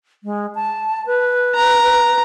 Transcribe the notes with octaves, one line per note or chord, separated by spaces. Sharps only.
G#3
A5
B4
A#5